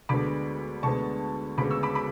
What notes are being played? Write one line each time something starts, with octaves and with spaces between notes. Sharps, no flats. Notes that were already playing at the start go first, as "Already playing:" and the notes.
D2 D3 G#3 B3 B5 D6
D2 D3 G#3 B3 A5 C#6
D2 C#3 G#3 B3 B5 D6
C#6 E6
B5 D6
B5 D6